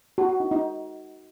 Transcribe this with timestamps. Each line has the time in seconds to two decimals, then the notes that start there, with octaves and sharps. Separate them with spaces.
0.18 F#4
0.29 F#4
0.40 D#4
0.51 D#4